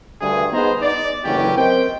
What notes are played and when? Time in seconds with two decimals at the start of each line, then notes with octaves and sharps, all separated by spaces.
0.21 D2 G2 G#4
0.53 B3 D#4 G#4 B4 C5 A#5
0.82 D#4 D5
1.25 F#1 D2 E3 F#3 C#4 G4
1.57 C4 A#4 C5 D#5 G5